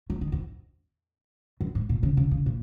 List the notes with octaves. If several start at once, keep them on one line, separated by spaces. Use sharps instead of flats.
F#3
D#3
F2
F#2
G#2
A#2
C#3
C#3
C#3
A#2